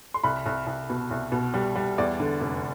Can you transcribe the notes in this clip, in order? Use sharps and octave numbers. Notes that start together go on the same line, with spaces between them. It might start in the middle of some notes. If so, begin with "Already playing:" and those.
C6
C2 B5
C2
C2
B2
C2
B2
G3
G3
E2 D5
D3
F1